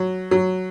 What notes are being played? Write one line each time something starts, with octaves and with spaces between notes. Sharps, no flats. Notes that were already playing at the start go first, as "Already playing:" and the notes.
Already playing: F#3
F#3